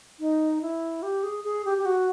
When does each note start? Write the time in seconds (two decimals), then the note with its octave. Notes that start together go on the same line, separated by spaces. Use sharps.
0.20 D#4
0.62 E4
1.03 G4
1.23 G#4
1.44 G#4
1.65 G4
1.78 G4
1.86 F#4